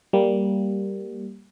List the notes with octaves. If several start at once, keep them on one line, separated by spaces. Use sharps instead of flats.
G3 A#3